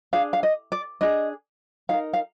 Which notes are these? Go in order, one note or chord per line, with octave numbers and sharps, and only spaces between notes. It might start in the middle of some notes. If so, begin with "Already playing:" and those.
D4 G#4 F5
F5
D#5
D5
D4 G#4 D#5
D#4 A#4 F5
F5